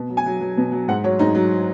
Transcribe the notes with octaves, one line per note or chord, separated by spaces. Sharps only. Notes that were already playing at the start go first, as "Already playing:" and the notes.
Already playing: B2
F#3
G#5
F#3
F#3
B2
F#3
G#2 F#5
F#3 C#5
G#2 D#4
F#3